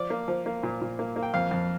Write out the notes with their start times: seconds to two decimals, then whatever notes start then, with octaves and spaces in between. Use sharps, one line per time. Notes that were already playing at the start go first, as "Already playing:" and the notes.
Already playing: F3 D5
0.10 A#3
0.28 F3
0.46 A#3
0.63 A#2
0.81 A#2
0.99 A#3
1.16 A#3
1.23 G5
1.34 F2 F5
1.51 F2